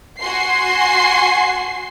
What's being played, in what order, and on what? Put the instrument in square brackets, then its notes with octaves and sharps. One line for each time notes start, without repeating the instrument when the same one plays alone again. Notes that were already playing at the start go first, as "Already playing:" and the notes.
[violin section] F#4 G#5 C6 C7